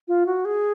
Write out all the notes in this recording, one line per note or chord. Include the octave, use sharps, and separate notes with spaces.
F4
F#4
G#4